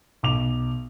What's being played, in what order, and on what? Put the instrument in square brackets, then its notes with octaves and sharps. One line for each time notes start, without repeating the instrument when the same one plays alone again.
[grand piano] B1 D6 F7